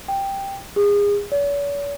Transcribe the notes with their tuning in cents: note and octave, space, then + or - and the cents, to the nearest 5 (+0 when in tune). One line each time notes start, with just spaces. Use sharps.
G5 +5
G#4 -30
C#5 +45